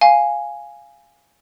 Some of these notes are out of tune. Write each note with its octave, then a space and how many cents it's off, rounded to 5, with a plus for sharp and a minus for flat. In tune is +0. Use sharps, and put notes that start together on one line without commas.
F5 +0 G#5 +0